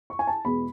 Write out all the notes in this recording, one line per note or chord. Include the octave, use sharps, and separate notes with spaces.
C#6
G#5
A5
E2 B2 G#3 B3 B5